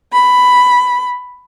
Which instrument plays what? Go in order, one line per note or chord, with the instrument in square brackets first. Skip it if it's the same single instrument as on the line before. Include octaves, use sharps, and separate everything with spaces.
[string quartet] B5